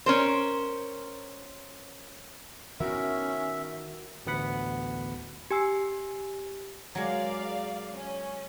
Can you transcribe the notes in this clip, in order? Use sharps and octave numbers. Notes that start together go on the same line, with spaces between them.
C#4 A#4 C5
D#3 B3 C#4 E4 F#4 A#4 E5
A1 D2 B3 F#5 B5
G4 G#5 E6 C7
F#3 G#3 A#4 D5 F5
C#4